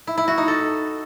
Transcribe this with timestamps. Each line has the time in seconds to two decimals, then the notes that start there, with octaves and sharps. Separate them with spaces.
0.07 E4
0.18 E4
0.28 F#4
0.38 D#4
0.48 A4